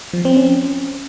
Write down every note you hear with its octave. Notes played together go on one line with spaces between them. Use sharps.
F3
C4
C#4